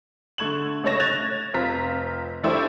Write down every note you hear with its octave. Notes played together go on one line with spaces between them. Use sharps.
D3 A3 C#6 G#6 E7 F#7
C#2 A3 C#4 C#5 A#6 E7
F#6 G#6 A6 E7 F7
F1 C4 F4 A#5 B6
F3 A3 D4 E4 G4 C5